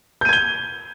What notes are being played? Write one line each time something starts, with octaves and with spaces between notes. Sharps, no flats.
G6 G#6 D#7 G7